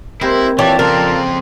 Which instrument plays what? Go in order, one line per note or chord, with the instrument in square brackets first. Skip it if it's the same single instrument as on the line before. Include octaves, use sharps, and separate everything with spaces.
[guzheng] G#3 A#3 C4 [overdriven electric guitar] E4 [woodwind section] G4 A#4 C5
[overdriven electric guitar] E3 [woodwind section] F4 D5 A5 [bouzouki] G4 C#5
[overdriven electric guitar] F2 C4 [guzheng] C#3 [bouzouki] A#4